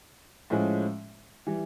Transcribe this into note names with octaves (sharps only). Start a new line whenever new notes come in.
A2 F3 G#3 C#4
E3 G3